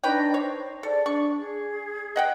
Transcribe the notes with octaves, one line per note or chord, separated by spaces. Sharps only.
D4 D#4 B4 C#5 D#5 G5
C5 C#5
G#4 A4 D5
D4 C#6
G#4
D#5 F#5 G5